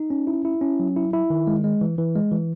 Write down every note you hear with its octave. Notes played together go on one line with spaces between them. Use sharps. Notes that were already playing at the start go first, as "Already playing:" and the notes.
Already playing: D#4
C#4
E4
E4
C#4
F#3
E4
E4
D#3
G#3
G#3
E3
E3
G#3
E3